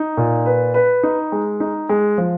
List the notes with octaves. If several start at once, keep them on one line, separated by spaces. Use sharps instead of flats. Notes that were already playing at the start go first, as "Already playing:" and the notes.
Already playing: D#4
A#2
B4
B4
D#4
G#3
D#4
G#3
F3